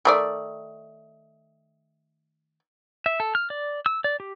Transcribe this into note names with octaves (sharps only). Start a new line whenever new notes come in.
D#3 A3 D5
E5
A4
F6
D5
E6
D5
G4